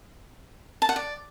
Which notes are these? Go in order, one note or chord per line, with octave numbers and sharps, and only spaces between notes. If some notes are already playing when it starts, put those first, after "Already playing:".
A5
F#5
D5